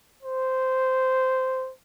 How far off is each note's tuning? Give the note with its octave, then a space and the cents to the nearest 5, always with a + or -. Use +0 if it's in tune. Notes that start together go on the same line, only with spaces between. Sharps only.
C5 -10